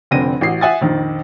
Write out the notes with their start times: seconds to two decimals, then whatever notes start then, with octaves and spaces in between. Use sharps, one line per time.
0.11 F1 D3 C4 A#6 D#7
0.41 A1 F#4 C7
0.61 E5 F#5 G#5 D#6 A6
0.81 A#1 F2 D#3